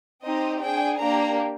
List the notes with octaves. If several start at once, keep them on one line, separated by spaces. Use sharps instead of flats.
C4 D#4 G4 D#5
D4 G#4 G5
A#3 D4 G4 A#5